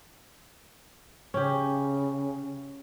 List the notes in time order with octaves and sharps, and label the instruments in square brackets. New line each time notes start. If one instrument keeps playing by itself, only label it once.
[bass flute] C#3 [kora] C#4 G4